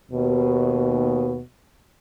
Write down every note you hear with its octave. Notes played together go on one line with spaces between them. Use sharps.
D#2 B2